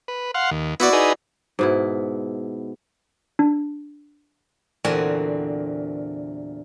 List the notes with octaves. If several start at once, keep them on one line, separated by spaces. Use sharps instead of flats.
B4
F5 F#5 C6
D#2
B3 E4 F#4 D5
D#4 G#4 B4
G#2 B2 E4
D4
E2 A#2 D3 C4 F#4 G#5